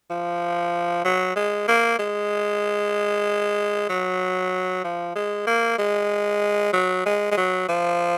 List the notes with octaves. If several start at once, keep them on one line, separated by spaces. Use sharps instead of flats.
F3
F#3
G#3
A#3
G#3
F#3
F3
G#3
A#3
G#3
F#3
G#3
G#3
F#3
F3